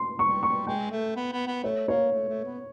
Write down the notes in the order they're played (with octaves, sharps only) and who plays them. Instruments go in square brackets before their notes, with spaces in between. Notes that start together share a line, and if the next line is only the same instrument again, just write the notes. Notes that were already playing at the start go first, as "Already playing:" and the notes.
Already playing: [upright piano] C6
[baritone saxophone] G3 [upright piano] C#6
[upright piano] C#6
[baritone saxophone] G#3 [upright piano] G5
[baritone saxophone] A3
B3
B3
B3
[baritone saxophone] A3 [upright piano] C#5
[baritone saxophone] A#3 [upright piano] C#5
[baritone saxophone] A3
A3
B3